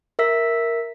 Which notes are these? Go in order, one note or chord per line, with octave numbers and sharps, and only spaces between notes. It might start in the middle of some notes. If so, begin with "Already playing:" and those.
A#4 E5 E6 B6